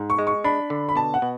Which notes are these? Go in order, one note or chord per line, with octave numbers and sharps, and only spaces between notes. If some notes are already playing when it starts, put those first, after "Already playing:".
Already playing: G#2
C#6
G#3
C#6
D4 B5
D3
B5
B2 A5
F#5
B2